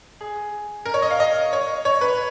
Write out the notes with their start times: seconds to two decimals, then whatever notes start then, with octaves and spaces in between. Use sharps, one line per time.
0.21 G#4
0.86 A#4
0.94 C#5
1.02 D#5
1.11 F5
1.20 D#5
1.53 C#5
1.85 C#5
2.01 B4